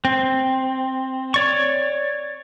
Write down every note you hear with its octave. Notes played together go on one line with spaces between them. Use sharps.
C4
C#5 D5 C#6